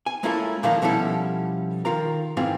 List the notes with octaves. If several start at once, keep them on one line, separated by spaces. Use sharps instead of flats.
G#5
G#3 A#3 C#4 E4 F4 A4
A#2 D#3 F3 A3 A#3 F4
B2 F3 G3 C#4 E4 A4
D#3 F4 A#4 A#5
G#2 E3 C4 F4